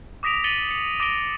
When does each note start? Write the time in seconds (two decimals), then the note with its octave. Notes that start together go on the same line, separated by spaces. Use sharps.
0.23 D6 D#6 A#6 B6 D7 F7
0.44 A6 B6 C#7 D#7 F#7 G7
0.67 B6 C#7
1.00 D6 A#6 D7 G7